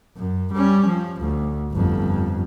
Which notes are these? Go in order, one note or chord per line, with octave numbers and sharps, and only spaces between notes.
F#2
G3 C#4
F3
D2
G1 F2